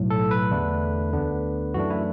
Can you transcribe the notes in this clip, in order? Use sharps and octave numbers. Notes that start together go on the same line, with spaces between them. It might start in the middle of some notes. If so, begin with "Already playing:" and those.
Already playing: B1 A2 F#3
A4
B4
E2 D3 A3 D4
D2 D3 B3 D4
F#2 E3 A3 D4 F#4
E4